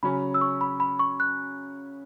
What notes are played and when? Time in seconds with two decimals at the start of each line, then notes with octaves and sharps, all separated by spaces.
0.03 C#3 F#3 C#4 B5
0.34 E6
0.41 C#6
0.61 B5
0.80 B5
0.99 C#6
1.20 F#6